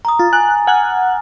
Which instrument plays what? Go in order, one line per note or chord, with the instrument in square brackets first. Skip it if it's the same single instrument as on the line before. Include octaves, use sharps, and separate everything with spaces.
[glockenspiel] A#5 D#6
[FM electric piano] F4 [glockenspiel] A6
[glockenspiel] G#5 [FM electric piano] F#6
[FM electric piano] F#5 G#5 F#6 [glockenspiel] F6